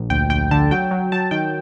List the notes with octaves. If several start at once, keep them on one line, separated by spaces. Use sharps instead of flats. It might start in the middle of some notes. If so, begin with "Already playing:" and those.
Already playing: A#1
D2 G5
D2 G5
D3 A5
F#3 G5
F#3
F#3 A5
D#3 G5